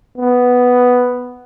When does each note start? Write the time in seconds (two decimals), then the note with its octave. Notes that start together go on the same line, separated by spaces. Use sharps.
0.18 B3